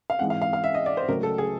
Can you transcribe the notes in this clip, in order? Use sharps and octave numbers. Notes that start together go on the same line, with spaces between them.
F5
G#2 E3 G#3 C4 F#5
F5
F5
F5
E5
D#5
D5
C5
C#2 C#3 F#3 A3 A#4
A4
G#4